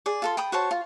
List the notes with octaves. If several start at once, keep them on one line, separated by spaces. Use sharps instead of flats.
G#4 D5
F4 A4 C6
G5 B5 D#6
F#4 C5 C#5 A5
F4